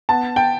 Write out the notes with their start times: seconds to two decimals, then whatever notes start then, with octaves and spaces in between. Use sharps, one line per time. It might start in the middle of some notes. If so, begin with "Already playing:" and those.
0.09 B3 A5
0.36 G5